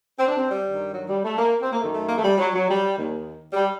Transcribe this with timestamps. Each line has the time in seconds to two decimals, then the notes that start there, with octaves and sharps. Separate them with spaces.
0.18 C4
0.28 D4
0.37 C4
0.51 G3
0.65 G2 D#3
0.94 F#3
1.09 G3
1.24 A3
1.38 A#3
1.62 C4
1.71 A#3
1.80 F#2 D#3 A3
1.95 A3
2.09 A#3
2.18 A3
2.24 G3
2.38 F#3
2.53 F#3
2.67 G3
2.95 D#2 D#3
3.53 G3